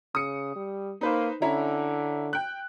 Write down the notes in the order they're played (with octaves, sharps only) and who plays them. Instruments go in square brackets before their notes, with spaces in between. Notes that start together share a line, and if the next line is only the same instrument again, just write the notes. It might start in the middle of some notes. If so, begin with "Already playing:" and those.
[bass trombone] C#3 [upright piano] D#6 C#7
[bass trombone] G3
[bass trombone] A#3 [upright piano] D#4 B4 C5
[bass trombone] D3 [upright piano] C#4 E4 A#5
[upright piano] G5 F#6